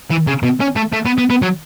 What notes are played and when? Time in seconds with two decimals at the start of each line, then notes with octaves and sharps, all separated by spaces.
0.11 E3
0.27 C#3
0.43 B2
0.60 C#4
0.76 A3
0.93 A3
1.06 B3
1.18 B3
1.30 B3
1.42 F#3